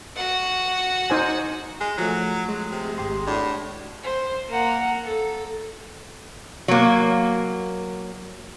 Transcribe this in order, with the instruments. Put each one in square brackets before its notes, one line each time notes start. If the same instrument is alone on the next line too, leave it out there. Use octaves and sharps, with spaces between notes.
[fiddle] F#4 F#5
[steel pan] D#4 C5 G#5
[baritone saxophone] G#3
[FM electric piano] F3 A3 [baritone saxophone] F#3
[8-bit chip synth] G#3
[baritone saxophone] C3
[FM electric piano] G#1 G4 C6
[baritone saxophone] A2 [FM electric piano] D4 F#4 D5
[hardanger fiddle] C5
A#3 F#5
A4
[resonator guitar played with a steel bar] F#3 A#3